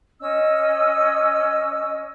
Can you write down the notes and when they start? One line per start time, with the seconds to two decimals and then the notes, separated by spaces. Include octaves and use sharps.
0.21 C#4 D#5 E6